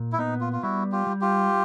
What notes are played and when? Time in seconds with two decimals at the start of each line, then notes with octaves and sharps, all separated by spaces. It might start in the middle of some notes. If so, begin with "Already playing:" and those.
Already playing: A#2
0.13 E4
0.19 B3 D#4
0.41 F4
0.53 F4
0.63 G3 E4 F#4
0.92 F4 G4
1.07 G3
1.21 F4 G4